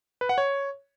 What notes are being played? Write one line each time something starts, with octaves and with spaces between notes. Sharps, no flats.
B4
F#5
C#5